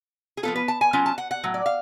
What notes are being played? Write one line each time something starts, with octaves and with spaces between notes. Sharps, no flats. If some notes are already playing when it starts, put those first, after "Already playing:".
G#4
F3 B3 F4 A4
B4
A5
G#5
F#3 C#4 F4 A5
A5
F#5
F#5
A2 F#3
D5
F5